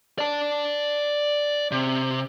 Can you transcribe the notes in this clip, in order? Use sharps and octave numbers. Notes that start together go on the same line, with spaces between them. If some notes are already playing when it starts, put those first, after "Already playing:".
D5 A5
C3